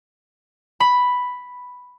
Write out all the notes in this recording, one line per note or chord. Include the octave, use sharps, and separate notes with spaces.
B5